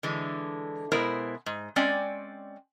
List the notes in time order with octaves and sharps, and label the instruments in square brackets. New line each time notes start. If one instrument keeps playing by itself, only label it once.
[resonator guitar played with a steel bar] D3 E3 G#3
B2 G#3 B3 E4 A#4 C5
G#2
G#3 C4 C#4 D5 G5 G#5